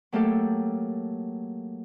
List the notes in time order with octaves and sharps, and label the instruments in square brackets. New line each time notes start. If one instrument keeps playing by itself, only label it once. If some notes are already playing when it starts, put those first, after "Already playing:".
[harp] F#3 A3 A#3 G4 A4